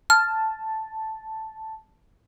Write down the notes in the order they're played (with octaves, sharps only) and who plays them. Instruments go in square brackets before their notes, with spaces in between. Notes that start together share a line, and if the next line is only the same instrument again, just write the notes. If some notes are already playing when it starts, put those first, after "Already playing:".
[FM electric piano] A5 [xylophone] F6